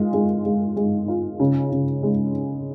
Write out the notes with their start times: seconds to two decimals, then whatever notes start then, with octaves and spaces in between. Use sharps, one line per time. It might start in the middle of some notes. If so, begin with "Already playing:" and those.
Already playing: G#3 F4
0.14 G#3
0.45 G#3
0.76 G#3
1.08 F4
1.40 C#3
1.72 C#3
2.03 G#3